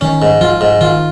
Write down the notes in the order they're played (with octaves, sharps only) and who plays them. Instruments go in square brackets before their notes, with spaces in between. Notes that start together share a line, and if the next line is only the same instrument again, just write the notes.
[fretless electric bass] D#3 [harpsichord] C#4
[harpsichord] G#2
[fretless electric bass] F3 [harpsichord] F4
[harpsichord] G#2
[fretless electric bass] D#3 [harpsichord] F4